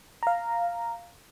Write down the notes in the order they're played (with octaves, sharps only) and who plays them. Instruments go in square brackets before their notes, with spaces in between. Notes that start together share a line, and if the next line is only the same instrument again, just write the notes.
[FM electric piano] F5 A#5